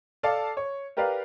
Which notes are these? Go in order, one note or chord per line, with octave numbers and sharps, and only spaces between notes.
A4 D5 F5 A5 D6
C#5
G4 A#4 B4 D5 F5